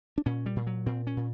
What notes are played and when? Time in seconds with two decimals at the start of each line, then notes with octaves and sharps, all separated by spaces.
0.18 D4
0.26 A#2 C#4
0.46 G3
0.56 A#2
0.67 F#3
0.86 A#2 C4
1.07 C#4
1.17 A#2